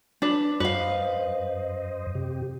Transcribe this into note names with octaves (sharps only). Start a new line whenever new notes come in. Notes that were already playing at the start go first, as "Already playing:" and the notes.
D4 B4
F#2 B4 C5 D#5 F5
C3 G4